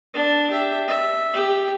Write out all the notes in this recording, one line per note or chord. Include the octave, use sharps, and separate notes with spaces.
D4
G4 E5
E5
G4